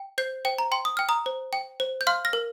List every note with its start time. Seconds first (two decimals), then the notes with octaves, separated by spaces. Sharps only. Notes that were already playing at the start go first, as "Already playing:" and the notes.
Already playing: G5
0.18 C5 G6 C7
0.45 C5 G5
0.58 A#5
0.72 G5 C6
0.85 D#6
0.97 G5 F6
1.09 A#5 D#6
1.26 C5
1.53 G5
1.80 C5
2.01 G6
2.07 F5 C6 F6
2.25 F6 A#6
2.33 A#4